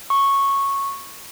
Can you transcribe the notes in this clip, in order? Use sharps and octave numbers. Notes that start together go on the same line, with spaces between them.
C#6